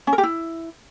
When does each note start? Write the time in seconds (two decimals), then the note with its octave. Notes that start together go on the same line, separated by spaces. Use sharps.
0.07 C#4
0.13 A#4
0.18 G4
0.23 E4